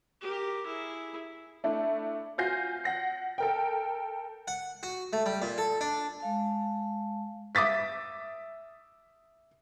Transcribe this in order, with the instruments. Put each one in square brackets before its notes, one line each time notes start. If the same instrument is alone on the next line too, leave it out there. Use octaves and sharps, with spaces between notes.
[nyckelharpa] G4 A#4
E4 G#4
[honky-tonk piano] A3 D4 E4
F4 F#4 G#5 G6 A#6 C7
F#5 A#6 C7
A4 A#4 G5
[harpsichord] F#5
F#4
A3
G3
A#2
A4
D4
[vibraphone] G#3 F5 A5
[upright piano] E5 D6 D#6 A6 B6